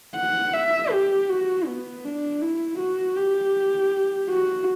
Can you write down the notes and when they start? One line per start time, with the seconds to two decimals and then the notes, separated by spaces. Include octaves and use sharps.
0.16 F#5
0.54 E5
0.91 G4
1.29 F#4
1.66 B3
2.04 D4
2.42 E4
2.79 F#4
3.16 G4
4.29 F#4